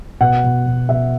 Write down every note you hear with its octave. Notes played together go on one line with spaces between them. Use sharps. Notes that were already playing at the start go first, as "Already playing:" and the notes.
B2 F#5
B2
B2
B2 E5